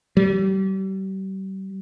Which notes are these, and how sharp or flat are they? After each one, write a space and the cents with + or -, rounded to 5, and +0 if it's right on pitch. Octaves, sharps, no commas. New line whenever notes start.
G3 -35